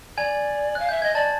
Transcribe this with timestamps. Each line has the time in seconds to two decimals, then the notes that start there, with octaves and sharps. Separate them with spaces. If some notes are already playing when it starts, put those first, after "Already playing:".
0.17 D5 G#5 G#6
0.75 F5 F#6
0.89 E5 G6
1.02 D#5 G#6
1.15 D5 A5 A6